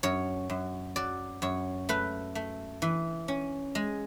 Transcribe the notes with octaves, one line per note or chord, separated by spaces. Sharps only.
F#2 C#5
F#2
F#3 D5
F#2 C#5
A3 B4
A3
E3
C#4
G#3